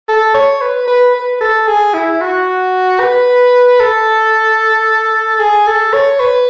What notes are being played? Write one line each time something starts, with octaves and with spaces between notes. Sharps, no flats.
A4
C#5
B4
B4
B4
A4
G#4
E4
F#4
B4
A4
G#4
A4
C#5
B4